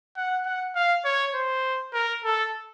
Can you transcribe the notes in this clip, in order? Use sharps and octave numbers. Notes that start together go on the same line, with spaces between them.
F#5
F#5
F5
C#5
C5
A#4
A4